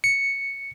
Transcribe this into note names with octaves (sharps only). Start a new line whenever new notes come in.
C#7